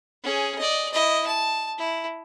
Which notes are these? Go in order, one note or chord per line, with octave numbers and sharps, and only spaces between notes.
C#4 G#4
D5 D#5
E4 D#5
A5
E4